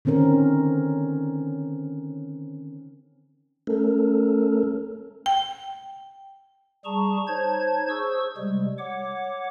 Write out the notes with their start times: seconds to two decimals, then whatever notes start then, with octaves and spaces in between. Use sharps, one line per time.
0.05 D3 D#3 C4 C#4 A#4
3.67 A3 C#4 A4 A#4
5.26 G5
6.85 G3 G#4 A5 A#5 C#6
7.27 D#4 C5 C#5 A5 G#6
7.89 G#4 C5 C#6 E6
8.37 C3 G3 G#3
8.78 C#5 F#5 D6